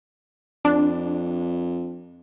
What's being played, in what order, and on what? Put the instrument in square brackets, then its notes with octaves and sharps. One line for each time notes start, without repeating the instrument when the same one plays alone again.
[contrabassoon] F2 [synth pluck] D4